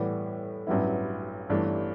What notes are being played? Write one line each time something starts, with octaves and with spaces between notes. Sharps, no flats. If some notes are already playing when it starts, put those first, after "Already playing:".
Already playing: A2 E3 G3 B3
A1 G2 F#3 B3 E4
G1 G2 E3 A3 D4